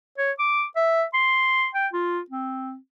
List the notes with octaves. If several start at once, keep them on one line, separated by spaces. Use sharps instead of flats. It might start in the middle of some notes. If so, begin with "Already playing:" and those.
C#5
D6
E5
C6
G5
F4
C4